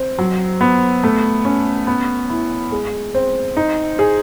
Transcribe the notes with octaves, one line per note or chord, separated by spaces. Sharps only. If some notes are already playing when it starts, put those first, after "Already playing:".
Already playing: C4
F#3
B3
A3
C#4
B3
E4
G#3
C4
D#4
G#4